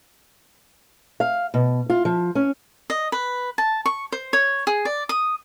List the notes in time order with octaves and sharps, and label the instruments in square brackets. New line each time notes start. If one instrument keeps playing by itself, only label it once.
[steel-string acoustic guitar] F5
B2
F4
F3
C#4
[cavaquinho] D#5
B4
A5
C#6
C5
C#5
G#4
D5
D#6